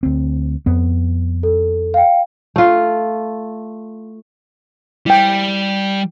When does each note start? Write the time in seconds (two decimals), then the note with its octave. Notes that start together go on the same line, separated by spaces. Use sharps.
0.03 D2 C4
0.66 F2 B3
1.43 A4
1.94 F5 G5
2.56 A3 F4
5.06 G3 E4 G5